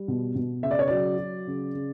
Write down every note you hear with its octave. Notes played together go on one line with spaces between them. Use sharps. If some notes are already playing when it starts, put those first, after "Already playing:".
Already playing: G3
B2
B2
C#3 E5
D5
C#5
F#3 D5
F#3
C#3
C#3